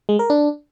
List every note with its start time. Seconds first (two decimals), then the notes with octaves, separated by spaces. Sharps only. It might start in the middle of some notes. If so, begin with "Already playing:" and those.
0.09 G#3
0.19 A#4
0.30 D4